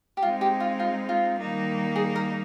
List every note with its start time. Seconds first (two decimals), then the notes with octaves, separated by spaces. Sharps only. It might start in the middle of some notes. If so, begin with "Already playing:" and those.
0.17 G4
0.22 G#3 C4 D#4 F4
0.41 G4
0.60 F4
0.80 F4
1.09 F4
1.38 D#3 G3 A#3 D#4
1.96 G#4
2.16 A#4